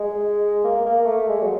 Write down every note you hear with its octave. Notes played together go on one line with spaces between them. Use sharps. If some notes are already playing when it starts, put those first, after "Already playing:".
Already playing: G#3
A#3
A#3
A3
G#3
F#3